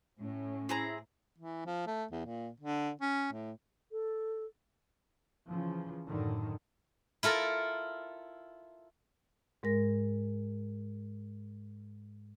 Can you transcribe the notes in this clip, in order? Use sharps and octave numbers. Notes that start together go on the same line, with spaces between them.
A2 C#4
C4 E4 G#4 A#5
E3
F3
A3
E2
A#2
D3
C#4
A2
A4
C#3 E3 F3
F#2 A2 D3 D#3
E4 F4 A4 A#4
G#2 G#3 A#4 A#6